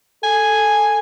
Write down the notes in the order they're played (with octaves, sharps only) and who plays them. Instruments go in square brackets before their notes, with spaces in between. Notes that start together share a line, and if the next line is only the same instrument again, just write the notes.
[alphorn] A4 [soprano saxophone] G#5